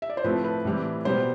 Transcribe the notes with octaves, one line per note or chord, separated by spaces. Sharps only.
E5
D5
C5
A2 F3 A3 C4 B4
B4
A2 E3 G3 C4
B2 G3 B3 C5